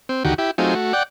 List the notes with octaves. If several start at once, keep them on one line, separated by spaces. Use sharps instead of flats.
C4
D2 D#3 F#4 G4
E4 G4
F#3 A3 C4 D#4 F4 G#4
A3 F#4
D5 F#5 G5